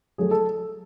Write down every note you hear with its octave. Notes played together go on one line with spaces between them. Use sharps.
F#3 A3 G#4
A4